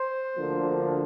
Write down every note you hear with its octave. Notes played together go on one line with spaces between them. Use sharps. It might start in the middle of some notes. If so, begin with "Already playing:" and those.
Already playing: C5
D2 D3 F3 A#3